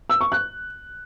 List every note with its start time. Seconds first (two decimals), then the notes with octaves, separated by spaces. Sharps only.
0.10 E6
0.21 C#6
0.32 F#6